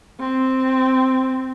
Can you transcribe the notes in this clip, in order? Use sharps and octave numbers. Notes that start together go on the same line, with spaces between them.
C4